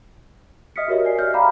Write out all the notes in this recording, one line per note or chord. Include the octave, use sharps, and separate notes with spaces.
D#5 E5 D#6 F6 B6 C#7
F#4 G4 A#4 C#5 D#5 E5
D5 G#5 C7
E5 F6 G6
F5 G5 A#5 B5 D6